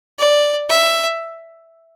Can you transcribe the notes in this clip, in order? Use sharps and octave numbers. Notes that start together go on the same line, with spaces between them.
D5
E5